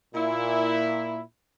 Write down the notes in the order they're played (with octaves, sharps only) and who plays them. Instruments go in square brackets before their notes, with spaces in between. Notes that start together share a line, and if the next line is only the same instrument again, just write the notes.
[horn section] A#2 E4